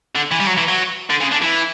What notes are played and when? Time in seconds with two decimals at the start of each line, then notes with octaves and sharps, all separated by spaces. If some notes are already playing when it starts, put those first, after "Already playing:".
0.15 D3
0.31 E3
0.40 G3
0.47 F#3
0.57 E3
0.68 F#3
1.10 D3
1.20 C#3
1.32 D3
1.42 E3